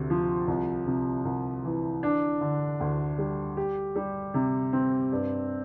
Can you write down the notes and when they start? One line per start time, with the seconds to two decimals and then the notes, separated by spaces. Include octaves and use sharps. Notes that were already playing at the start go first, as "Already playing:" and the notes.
Already playing: D2 C3 C4
0.10 F3
0.48 C2
0.86 C3
1.25 C2
1.64 E3
2.03 D4
2.41 D3
2.80 D2
3.18 G3
3.57 G4
3.96 G3
4.34 C3
4.73 C4
5.12 G2